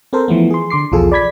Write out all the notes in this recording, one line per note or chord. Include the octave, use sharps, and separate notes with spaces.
C4 A4 A#4 C5
E3 F3 A3 B3
G#4 C6
D3 C6 D6 C7
B1 E2 F3 F4 G#4 A4
D5 B5 G#6 B6